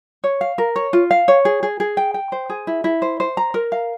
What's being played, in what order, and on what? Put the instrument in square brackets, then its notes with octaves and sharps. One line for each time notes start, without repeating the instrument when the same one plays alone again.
[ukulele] C#5
F5
A#4
C#5
F4
F5
C#5
G#4
G#4
G#4
G5
G5
C5
G#4
E4
E4
C5
C5
A#5
A#4
F5